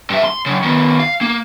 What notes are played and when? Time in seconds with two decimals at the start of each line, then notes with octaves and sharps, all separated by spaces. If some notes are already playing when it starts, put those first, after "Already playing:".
0.10 G2 E5
0.24 C6
0.46 C#3 F#3
0.63 D#3 B3
0.99 F5
1.21 A#3